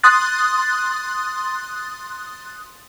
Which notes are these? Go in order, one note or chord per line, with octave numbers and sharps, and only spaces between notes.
C6 D#6 F#6 A6